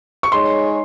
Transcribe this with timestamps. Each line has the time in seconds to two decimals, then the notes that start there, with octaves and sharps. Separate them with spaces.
0.23 C#6
0.32 G#3 D#4 G#4 C#5 C6